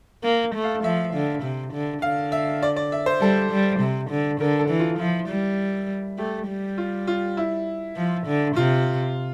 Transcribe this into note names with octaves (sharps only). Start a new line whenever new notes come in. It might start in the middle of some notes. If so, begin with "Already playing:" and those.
A#3
A3
F5
F3 E5
D3
C3
D3
D3 F5
E5
D5
D5
E5
C5
G3 A4
G3
C3
D3
D3 A#4
A4
E3
F4
F3 E4
G3
A3 G4
G3
F4
F4
E4
F3
D3
C3 F4